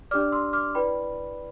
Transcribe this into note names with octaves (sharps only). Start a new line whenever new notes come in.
D4 G4 D5 D6 F6
C6 E6
D6 F6
E4 B4 D5 G5 B5